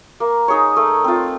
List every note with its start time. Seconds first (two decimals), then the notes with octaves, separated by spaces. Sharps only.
0.20 A#3
0.48 D#4 G#4 C#5
0.76 A3
1.04 C4 F4